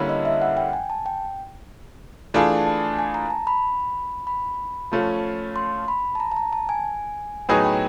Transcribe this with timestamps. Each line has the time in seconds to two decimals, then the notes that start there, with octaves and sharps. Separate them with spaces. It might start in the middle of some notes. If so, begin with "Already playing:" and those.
Already playing: D3 G3 A#3 C#4 E4
0.09 D#5
0.25 E5
0.42 F#5
0.57 G5
0.73 G#5
0.90 A5
1.06 G5
2.34 E3 A3 D4 F4 G#4 A5
2.67 A5
2.99 G#5
3.14 A#5
3.30 A5
3.47 B5
4.27 B5
4.92 F3 A3 C#4 F4
5.56 C6
5.88 B5
6.15 A5
6.20 A#5
6.32 A5
6.36 A#5
6.53 A5
6.69 G#5
7.49 A2 F#3 B3 D#4 G#4 G5
7.65 G5